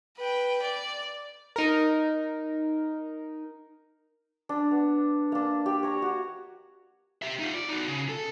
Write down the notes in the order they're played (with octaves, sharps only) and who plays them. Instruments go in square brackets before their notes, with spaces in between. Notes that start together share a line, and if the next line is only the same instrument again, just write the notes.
[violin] B4 G5
D5
[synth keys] D#4 A#4
[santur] D4
B3
A#3 D4
G4
C#5 A#5
F#4
[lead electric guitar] G4 E5
D#4 F4
D5
D#4 F#4
C#3
A4